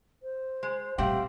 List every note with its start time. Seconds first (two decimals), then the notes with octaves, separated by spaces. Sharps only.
0.23 C5
0.63 G#3
0.98 G2 A#2 A3 C4 G4 F5 F#5